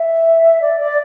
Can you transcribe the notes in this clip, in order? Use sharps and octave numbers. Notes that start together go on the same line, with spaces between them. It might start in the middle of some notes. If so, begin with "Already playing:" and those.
Already playing: E5
D5
D5